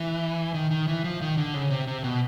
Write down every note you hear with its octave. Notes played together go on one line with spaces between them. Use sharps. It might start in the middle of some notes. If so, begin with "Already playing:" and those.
Already playing: E3
D#3
D#3
E3
F3
D#3
D3
C#3
C3
C3
B2